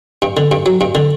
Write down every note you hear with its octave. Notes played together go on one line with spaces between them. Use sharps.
G2
D3
G2
F#3
G2
D3